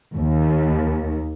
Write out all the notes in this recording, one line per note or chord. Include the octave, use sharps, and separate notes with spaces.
D#2